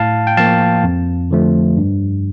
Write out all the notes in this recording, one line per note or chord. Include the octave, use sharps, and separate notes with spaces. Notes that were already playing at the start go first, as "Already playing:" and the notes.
Already playing: A2 F5 A5
G5
F3 A#3 F5 A5
F2
D3 F3 A3
G2